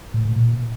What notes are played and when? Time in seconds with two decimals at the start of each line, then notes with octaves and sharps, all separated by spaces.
0.14 A2
0.25 A2
0.36 A#2